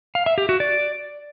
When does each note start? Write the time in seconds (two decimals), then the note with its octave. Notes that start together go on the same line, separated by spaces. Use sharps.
0.15 F5
0.26 E5
0.38 G4
0.49 F#4
0.60 D5